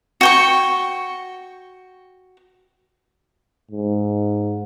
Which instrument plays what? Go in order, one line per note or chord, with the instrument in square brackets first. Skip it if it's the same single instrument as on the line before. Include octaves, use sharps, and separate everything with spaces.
[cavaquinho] F#4 G5 C#6
[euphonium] G#2